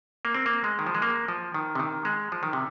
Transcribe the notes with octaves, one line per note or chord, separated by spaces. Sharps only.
A#3
C4
A#3
G#3
D#3
F3
G#3
A#3
F3
D#3
C3
D#3
G#3
F3
D#3
C3